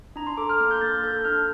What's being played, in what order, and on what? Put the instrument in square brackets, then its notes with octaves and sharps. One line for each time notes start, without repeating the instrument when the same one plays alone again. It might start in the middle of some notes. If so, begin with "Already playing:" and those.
[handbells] D4 A#5
C6
A4 D6
F6
A#3
G6
A#3 A6
A4 G6
D4 F6